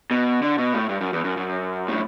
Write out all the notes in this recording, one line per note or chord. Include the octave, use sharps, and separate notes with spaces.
B2
D3
B2
A2
G2
F#2
E2
F#2
F#2
A2